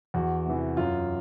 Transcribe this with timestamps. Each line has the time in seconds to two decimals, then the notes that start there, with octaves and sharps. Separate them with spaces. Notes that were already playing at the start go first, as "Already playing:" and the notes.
0.14 E2 F#4
0.46 C3 E3
0.77 F#2 F4